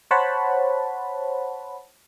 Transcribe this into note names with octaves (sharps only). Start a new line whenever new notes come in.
C5 C#5 F#5 A5 B5